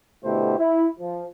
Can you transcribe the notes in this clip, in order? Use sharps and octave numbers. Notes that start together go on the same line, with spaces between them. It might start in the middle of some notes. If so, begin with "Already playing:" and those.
B2 D3 A3 E4 G4 C5
E4
F3